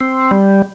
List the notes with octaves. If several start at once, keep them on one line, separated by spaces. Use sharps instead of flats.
C4
G3